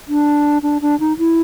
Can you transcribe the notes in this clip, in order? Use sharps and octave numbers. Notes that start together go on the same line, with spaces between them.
D4
D4
D4
D#4
E4